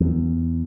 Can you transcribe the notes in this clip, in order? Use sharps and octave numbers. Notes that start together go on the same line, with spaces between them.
E2